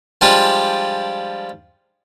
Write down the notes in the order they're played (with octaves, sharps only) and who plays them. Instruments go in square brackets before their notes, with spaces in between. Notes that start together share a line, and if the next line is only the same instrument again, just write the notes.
[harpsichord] F3 G3 G#3 D4 F4 G4